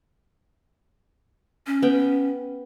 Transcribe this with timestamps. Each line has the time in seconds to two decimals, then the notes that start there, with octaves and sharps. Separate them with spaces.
1.67 C#4
1.82 B3 G5